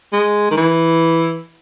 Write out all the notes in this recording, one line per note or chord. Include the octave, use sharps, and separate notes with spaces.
G#3
D#3
E3